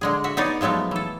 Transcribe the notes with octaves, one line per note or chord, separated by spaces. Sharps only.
D3 G#3 G#4
F#4 E5
B3 D#4 G#4 C#5 D5
F3 F#3 G#3 A3 B3
E3 A4